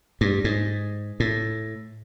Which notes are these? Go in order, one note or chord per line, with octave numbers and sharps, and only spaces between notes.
G2
G#2
A2